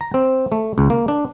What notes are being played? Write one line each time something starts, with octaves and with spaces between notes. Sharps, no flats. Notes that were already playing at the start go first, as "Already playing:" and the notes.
A#5
C4
A3
C#2
A#3
D4